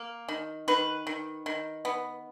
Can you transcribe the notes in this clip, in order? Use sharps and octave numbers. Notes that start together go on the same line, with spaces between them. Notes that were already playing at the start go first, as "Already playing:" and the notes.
Already playing: A#3
D#3
D#3 B4
D#3
D#3
B3